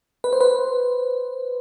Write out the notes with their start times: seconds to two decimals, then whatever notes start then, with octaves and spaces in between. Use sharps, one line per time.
0.24 B4
0.33 C5
0.41 B4